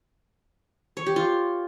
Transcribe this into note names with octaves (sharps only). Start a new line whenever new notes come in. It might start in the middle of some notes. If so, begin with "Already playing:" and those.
C#5
G4
F4